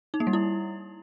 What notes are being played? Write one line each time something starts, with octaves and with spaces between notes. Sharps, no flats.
D#4
A#3
G3
E4